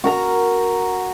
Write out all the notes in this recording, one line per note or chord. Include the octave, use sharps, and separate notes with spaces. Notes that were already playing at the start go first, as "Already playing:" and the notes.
F#4 A#4 A#5